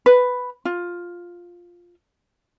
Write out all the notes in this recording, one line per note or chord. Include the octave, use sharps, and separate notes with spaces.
B4
F4